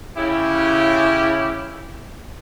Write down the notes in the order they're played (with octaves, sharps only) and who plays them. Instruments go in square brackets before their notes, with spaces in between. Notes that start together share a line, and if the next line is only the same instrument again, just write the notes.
[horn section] C#3 E4 G4